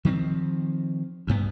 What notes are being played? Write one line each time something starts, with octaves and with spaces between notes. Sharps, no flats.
D#3 F3 A3 C4
D2 G2 B3